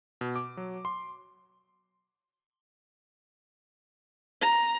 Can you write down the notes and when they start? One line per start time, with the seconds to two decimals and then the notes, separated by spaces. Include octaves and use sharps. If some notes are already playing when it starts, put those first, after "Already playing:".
0.21 B2
0.36 D6
0.57 F#3
0.85 C6
4.41 A#5